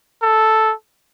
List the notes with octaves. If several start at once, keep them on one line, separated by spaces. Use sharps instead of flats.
A4